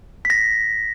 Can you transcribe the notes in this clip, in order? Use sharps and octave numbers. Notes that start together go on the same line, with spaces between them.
B6
A#6